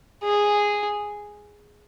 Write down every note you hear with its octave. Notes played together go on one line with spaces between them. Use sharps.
G#4